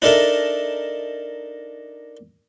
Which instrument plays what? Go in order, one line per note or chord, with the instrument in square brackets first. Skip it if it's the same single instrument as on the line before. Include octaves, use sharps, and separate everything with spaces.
[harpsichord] D4 D#4 A4 A#4 D#5 E5